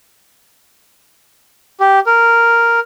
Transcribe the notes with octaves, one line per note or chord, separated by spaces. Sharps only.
G4
A#4